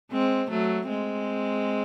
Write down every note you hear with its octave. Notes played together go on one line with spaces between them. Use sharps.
G#3 C4
F#3 A3
G#3 C4